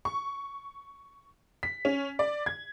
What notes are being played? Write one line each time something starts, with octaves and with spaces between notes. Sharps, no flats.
C#6
B6
C#4
D5
G#6